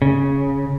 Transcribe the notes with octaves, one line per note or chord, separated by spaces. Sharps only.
C#3